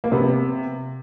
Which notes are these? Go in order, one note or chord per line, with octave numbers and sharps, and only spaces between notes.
A#3
C3 B3